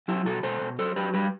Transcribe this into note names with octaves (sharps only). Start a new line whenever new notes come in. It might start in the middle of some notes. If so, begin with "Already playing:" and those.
F#3 E4 G4
B2 F#4 A4
B2 A4 C5
B2
F#3 A4 C5
F#3 G4 B4
G3 G4 B4